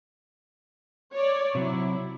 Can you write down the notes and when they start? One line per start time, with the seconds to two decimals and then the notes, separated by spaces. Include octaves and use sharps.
1.13 C#5 D5
1.55 C3 F#3 E4